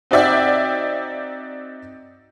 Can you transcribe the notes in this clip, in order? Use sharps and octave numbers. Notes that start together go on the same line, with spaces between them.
C4 D#4 F#4 D5 E5 G5